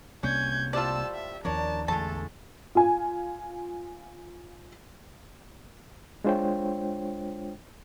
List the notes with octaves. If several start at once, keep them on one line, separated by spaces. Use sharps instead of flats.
C2 C3 A#3 C#4 G6 G#6
A2 G3 F4 C5 D5 A5 E6
E5
D#2 F3 D4 A#4 C#5 A5
A1 E2 D3 G#3 A3 A4 A5
F4 G#5
G#3 D4 F4 C5 C#5 G5